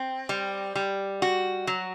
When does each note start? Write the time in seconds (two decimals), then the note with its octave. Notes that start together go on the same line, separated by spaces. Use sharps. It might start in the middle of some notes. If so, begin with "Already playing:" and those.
Already playing: C4
0.29 G3
0.75 G3
1.22 F#4
1.67 F#3